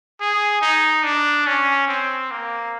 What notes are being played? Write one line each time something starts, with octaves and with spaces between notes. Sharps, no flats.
G#4
D#4
D4
C#4
C4
A#3